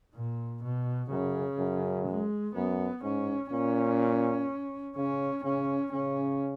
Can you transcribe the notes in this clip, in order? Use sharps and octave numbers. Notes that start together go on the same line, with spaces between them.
A#2
B2
F#2 C#3
F#2
G#3
F#2 B3
G#2 C#4
A#2 C#4
C#3 C#4
C#3 C#4
C#3 C#4